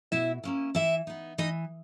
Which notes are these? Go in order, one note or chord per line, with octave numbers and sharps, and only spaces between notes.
B2 E4 E5
A#3 C#4 E4
E3 E4 E5
B3 D#4
E3 D#4 D#5